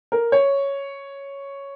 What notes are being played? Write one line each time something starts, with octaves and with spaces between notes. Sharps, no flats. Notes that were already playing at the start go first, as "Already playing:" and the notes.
A#4
C#5